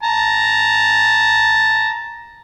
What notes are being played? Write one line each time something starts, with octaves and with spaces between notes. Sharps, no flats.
A5 A#5